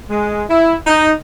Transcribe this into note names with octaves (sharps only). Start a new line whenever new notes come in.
G#3
E4
D#4